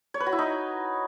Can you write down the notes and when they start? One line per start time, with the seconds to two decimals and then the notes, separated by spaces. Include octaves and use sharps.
0.14 C#5
0.20 B4
0.26 F#4
0.33 E4
0.39 D#4